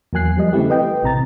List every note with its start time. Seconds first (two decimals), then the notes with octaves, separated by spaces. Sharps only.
0.13 E2 F#3 A#3 G#5 F#6 C7
0.37 F3 G3 D#5
0.53 C#3 A3 C4 E4 G4
0.70 B4 D#5 G5
1.03 A1 C3 A#5 A6